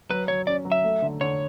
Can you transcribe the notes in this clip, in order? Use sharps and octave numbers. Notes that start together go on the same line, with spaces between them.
F#3 B4
F#3 C#5
C#4 D5
F#3
E5
A3
D3
D3 C#5